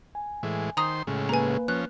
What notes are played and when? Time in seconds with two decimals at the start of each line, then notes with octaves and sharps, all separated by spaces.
0.15 G#5
0.43 A2 E3 G#3
0.77 D#3 C5 A#5 C6 D#6
1.07 A2 C#3 G#3
1.29 A#3 B4 G#5 A#5
1.68 F3 C#4 F#6